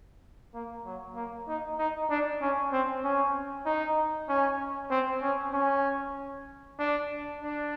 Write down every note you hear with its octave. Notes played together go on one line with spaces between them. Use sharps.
A#3
F#3
A#3
D#4
D#4
D4
C#4
C4
C#4
D#4
C#4
C4
C#4
C#4
D4
D4